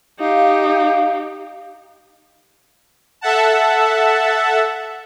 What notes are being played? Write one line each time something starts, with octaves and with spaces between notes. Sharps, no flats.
D#4 G4 F5
A4 E5 F#5 A5